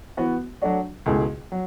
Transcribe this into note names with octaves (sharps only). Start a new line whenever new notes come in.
E3 B3 F#4
F#3 A3 D4 F#4
C#2 B2 A3 E4 G#4
F#3